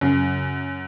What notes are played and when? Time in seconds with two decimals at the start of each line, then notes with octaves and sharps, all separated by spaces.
0.01 F#2 C#3